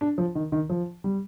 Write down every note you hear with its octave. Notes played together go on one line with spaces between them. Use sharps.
D4
F3
D#3
D#3
F3
G3